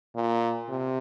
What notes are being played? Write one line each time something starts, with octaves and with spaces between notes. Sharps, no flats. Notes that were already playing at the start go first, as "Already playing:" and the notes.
A#2
C3